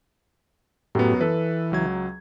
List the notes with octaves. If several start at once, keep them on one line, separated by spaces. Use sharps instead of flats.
F#2 A2 F#3 B3 F#4 G4
E3 A4 B4
C#2 F#3 G#6